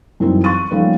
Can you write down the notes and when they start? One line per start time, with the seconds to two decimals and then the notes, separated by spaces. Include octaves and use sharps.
0.20 F#2 E3 G3 C4 D#4 E4
0.44 C#6 F#6 A6 D#7
0.70 D#3 F3 G3 A3 A#3 C#4